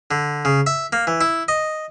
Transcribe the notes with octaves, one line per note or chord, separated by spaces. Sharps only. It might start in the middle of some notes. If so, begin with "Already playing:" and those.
D3
C#3
E5
A#3
E3
E4
D#5